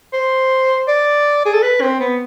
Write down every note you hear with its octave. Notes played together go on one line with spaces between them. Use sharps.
C5
D5
G#4
A4
B4
C4
B3